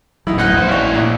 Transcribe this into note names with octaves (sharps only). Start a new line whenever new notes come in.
D1 A1 F#3 D#4 E4
B1 D#4 F#5 F#6
D#2 E3 F3 G3 C5
A1 E4 C#5 D5 F5
A#1